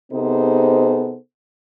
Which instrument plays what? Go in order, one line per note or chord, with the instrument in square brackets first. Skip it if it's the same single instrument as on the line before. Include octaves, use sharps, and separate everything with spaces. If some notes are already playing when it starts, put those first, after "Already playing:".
[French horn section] C3 B3 D#4 G#4 A4 C5